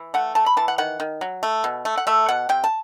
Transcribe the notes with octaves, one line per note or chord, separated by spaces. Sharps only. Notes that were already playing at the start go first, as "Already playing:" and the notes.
Already playing: E3
A3 F#5
A3 A5
B5
E3 A5
F#5
D#3 F#5
D#3
F#3
A3
B2
A3
F#5
A3 E5
B2 F#5
C3 G5
A5